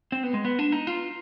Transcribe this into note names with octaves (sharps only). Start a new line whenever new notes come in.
C4
B3
G#3
B3
D4
D#4
F4